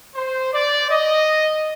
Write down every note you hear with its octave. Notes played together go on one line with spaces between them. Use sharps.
C5
D5
D#5